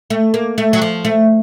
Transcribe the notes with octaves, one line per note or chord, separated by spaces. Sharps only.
A3
A#3
A3
F#3
F3
A3